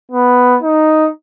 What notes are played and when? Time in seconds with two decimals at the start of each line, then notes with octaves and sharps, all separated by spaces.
0.12 B3
0.63 D#4